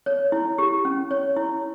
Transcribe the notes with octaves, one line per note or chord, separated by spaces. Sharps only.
C#5
E4
G4
C#4
C#5
E4